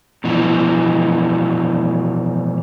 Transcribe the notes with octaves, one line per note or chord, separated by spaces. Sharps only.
B2 E3 F3